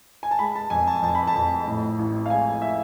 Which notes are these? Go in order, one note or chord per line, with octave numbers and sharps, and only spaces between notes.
G#5
A5
G#3 B5
A5
F2 G#5
A5
F2 A5
B5
A5
F2
A2
A1
F5
G#3 G#5
E5